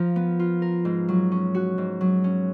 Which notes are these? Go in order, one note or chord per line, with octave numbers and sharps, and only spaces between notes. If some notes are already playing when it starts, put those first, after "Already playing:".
Already playing: F3 F4 A#4
B3
F4
A#4
G#2
F#3
C#4
F#4
G#2
F#3
C#4